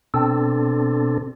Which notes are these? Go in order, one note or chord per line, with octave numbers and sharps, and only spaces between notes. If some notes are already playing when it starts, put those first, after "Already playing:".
B2 C4 D4 A4